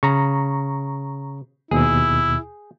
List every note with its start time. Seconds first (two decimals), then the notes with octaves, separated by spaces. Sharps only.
0.03 C#3 A#5 C#6
1.71 D#2 B2 E4 G#4